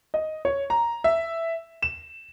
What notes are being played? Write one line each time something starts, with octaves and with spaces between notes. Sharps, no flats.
D#5
C#5
A#5
E5
E7